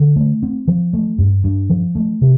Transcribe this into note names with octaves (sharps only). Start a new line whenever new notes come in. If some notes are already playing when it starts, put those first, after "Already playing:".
Already playing: D3
A3
C4
F3
A3
G2
G2
F3
A3
C3